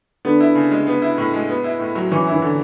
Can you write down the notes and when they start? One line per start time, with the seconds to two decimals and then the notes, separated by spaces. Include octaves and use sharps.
0.25 D3 B3
0.40 E4
0.55 C#3
0.71 G#3
0.87 B3
1.02 E4
1.18 A2
1.34 G#3
1.49 B3
1.64 E4
1.79 A2
1.95 F#3
2.11 E3 C#4
2.27 E4
2.32 E3
2.42 D3